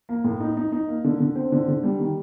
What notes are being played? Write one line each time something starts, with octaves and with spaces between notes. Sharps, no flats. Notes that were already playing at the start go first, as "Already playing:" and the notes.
A#3
A2
D#4
D#4
D#4
A#3
D3
D3
C4
D3
D3
G3
D#3